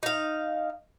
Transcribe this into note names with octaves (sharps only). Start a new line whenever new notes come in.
D#4 F5